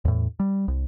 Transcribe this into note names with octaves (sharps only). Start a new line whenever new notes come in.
E2 A2
G3
C2